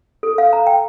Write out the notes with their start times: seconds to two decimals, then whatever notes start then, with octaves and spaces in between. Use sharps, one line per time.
0.23 A4
0.38 F5
0.53 A#5
0.67 G5